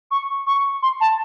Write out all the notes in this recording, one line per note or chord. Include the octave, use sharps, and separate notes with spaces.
C#6
C#6
C6
A5